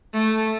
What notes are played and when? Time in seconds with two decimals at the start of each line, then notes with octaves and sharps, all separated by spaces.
0.14 A3